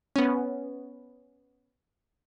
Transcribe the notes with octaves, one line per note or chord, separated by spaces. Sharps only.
B3 C#4